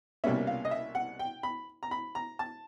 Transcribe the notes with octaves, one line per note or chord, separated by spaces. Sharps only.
C2 B2 G3 A#3 C#4 E5
F5
D#5
E5
F#5
G5
B5
A#5
B5
A#5
A5